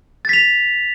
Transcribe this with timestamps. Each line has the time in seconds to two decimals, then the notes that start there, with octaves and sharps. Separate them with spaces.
0.25 A6
0.29 B6
0.33 F7